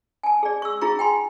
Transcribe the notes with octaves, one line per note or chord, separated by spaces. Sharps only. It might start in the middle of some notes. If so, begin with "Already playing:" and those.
G#5 A5
G#4 D5
C#6 E6
D#4 F4 G#4 A#5 C#6
G5 G#5 C6